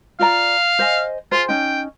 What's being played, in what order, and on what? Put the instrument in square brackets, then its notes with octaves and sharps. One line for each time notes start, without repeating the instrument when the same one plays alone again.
[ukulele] F4 D5 A#5 [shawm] F5
[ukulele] C5 D#5 G#5
[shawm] F4 [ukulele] G#4 C5
[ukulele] C#4 D#4 [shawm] G5